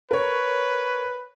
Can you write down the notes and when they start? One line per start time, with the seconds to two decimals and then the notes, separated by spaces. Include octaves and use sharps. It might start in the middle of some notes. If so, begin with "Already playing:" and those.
0.11 A#4 B4 C#5